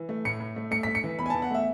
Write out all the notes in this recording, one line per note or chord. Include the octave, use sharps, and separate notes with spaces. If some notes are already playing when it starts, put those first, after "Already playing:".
Already playing: E3
A3
A2 C#7
A2
A3
A3 C#7
A3 B6
C#7
E3
E2 B5
G#5
E2 A5
F#5
A3 E5